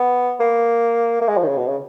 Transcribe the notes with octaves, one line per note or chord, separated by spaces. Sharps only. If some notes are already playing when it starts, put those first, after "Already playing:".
Already playing: B3
A#3
A#3
G#3
F3
D#3
C#3
B2
C#3